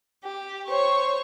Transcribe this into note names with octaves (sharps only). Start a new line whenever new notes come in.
G4
C5 C#5 C#6